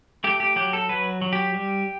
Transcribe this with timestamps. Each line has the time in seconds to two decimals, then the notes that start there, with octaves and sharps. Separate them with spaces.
0.24 A3 G4
0.40 G4
0.56 F#3 G4
0.73 A4
0.89 F#3 B4
1.21 F#3
1.33 G4
1.54 G3